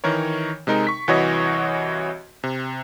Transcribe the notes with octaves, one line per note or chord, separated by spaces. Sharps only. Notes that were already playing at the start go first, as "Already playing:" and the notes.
D#3 E3 A#4 C#5
C3 G#3 D#4 A#4
C#6 B6
C2 E3 F#4 C#5 D#5
C3